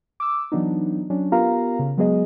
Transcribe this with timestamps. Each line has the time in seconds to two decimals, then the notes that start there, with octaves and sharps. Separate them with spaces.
0.20 D6 E6
0.52 E3 F#3 B3 D4 D#4
1.10 F#3 C#4 D4
1.32 B3 F4 G4 A#4 F5 A#5
1.79 C#3
1.98 F#3 G#3 B3 G#4 D#5